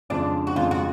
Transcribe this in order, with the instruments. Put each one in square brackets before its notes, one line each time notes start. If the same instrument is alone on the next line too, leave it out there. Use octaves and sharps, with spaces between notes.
[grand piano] F2 C#3 G#3 [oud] D4
[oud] F#4
[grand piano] F2 C#3 G#3 [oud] F4
[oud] F#4